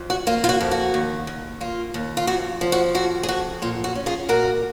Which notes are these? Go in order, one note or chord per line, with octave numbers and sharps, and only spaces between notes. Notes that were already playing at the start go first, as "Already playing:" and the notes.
Already playing: F2
F#4
A#3 F4
F4
F#4
F2
F#4
D#2
D#2
A#3 F4
D#2
F4
F2 F#4
F3
F#4
F2 F#4
G#4
F2 F#4
A#2 F4
F#4
C#4
F4 G#4
A#2 F#4 A#4